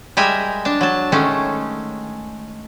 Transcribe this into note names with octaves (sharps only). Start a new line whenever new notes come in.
G3 G#3 A#4 E5 G#5
D4 A5
F#3 A5
D#3 G#3 A3 C#4